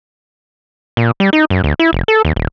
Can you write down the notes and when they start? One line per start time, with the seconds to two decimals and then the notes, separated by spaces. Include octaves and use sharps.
0.97 A#2
1.20 G3
1.33 D#4
1.50 F#2
1.64 D2
1.79 E4
1.93 F1
2.08 A4
2.25 D#2
2.36 D#1